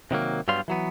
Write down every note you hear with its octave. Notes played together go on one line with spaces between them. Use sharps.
C3 D#3 F#3 A#3
G2 F#3 G3 B3 F5 C6
E3 F#3 B3